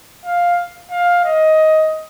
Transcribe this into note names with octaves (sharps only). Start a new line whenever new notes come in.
F5
F5
D#5